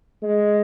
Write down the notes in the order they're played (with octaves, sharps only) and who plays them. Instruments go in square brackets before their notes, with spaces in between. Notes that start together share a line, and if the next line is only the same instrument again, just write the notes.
[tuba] G#3